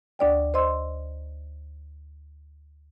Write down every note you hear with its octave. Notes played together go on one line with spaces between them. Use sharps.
D2 D4 D5 G5
C5 D#5 C6 E6